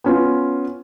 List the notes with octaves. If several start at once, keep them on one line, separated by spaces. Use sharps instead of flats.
B3 C#4 F4